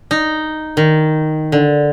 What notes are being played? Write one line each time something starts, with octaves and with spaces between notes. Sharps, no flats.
D#4
D#3
D3